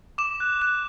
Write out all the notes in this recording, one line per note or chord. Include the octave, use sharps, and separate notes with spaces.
D6 E7
F#6
F#6 E7